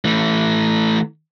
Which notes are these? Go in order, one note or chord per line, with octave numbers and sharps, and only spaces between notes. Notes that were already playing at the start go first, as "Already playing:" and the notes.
E3 A3